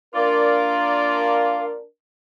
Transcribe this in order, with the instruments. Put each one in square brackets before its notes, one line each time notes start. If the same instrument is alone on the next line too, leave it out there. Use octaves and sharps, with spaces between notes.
[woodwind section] A#3 F4 D5 [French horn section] D4 A#4 [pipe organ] F5